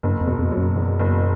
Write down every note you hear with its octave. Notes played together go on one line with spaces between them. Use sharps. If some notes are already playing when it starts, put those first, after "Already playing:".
F#1 G2
F2
B2
F2
F#3
F#2
E2
F#1